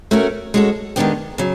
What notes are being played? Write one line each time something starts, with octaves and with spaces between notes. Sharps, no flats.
A3 C#4 F#4 A#4
G#3 C#4 F#4 A4
D#3 G#3 B3 D4 G4
C#3 F#3